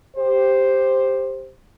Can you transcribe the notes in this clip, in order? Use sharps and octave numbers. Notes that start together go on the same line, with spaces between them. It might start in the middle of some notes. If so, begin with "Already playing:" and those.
G4 C5